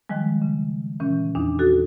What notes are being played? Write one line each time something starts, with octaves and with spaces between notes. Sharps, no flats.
D#3 F3 G3 G#3
C#3
A#2 E3 C#4
E2 D4 D#4
D#4 F#4 A4